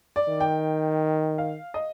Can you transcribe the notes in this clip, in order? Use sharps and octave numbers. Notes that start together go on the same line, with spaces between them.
D5
D#3
G5
F5
D#5